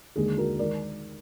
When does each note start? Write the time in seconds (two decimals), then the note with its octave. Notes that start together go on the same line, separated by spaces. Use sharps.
0.16 D#2 D3 G#3 G#4
0.37 F#4 A#4
0.59 D#3 G#3 A#4 D5